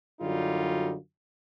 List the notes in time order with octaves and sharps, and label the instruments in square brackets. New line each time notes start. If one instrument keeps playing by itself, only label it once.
[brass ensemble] F#2 D3 G3 D#4 F4 F#4